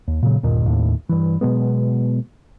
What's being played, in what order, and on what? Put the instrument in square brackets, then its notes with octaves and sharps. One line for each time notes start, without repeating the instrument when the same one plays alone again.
[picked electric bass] D#2
A#2 C#3 F#3
G1 D#2 A#2 D#3
D#2 A2
G2 E3
B2 F#3 G#3 B3